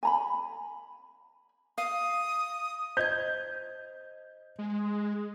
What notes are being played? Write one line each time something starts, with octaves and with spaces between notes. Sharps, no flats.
G#5 A#5 B5
F5 D#6
C5 D#5 G6 G#6
G#3